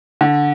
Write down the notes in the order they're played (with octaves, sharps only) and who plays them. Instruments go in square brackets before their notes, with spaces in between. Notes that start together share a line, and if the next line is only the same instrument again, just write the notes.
[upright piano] D3